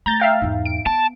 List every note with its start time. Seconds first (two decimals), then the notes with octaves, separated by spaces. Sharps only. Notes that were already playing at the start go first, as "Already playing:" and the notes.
0.06 A3 A#5 G6 A6
0.20 E5 F5 G5
0.42 E2 G#2
0.66 D7
0.86 B3 A5